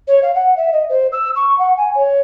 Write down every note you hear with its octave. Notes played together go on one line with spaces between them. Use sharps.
C#5
F5
F#5
E5
D#5
C5
E6
C#6
F#5
G#5
C#5